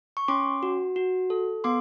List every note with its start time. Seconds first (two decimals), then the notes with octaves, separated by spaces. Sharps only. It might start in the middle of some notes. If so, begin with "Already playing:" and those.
0.17 C#6
0.28 C#4 C6 D6
0.63 F#4
0.96 F#4
1.30 A4
1.64 B3 C6 D6